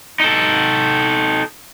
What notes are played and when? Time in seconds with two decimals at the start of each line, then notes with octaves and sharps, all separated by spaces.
0.20 D#4 A4